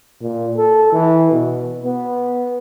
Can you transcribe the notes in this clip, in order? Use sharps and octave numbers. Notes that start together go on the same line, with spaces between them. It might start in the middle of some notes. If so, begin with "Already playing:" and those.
A#2
A4
E3
B2
B3